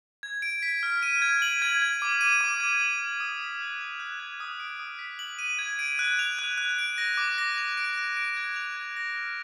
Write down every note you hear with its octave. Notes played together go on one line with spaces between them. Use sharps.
G#6
D7
B6
F6
D#7
G#6
F#7
G#6
G#6
D6
D#7
D6
G#6
F#7
D#7
D#6
B6
F#6
F7
F#6
G#6
D#6
D7
D#6
B6
F#7
D#7
G#6
D7
F#6
F7
F#6
F#6
D7
A#6
D6
A#6
F7
D7
F#6
D7
G#6
F7
G#6
A#6
F6